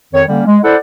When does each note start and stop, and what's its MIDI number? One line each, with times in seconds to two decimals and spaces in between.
0.14 0.23 41
0.14 0.23 51
0.14 0.23 73
0.29 0.43 50
0.29 0.43 55
0.29 0.43 58
0.29 0.43 61
0.47 0.58 56
0.64 0.76 64
0.64 0.76 69
0.64 0.76 72
0.64 0.76 74
0.64 0.76 78